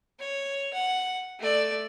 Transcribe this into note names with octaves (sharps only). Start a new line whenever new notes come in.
C#5
F#5
A3 D5